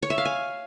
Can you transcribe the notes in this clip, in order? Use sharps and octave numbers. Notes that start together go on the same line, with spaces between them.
C#5
E5
F5
G#5